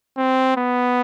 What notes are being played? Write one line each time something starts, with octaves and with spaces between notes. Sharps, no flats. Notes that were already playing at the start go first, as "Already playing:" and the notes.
C4
B3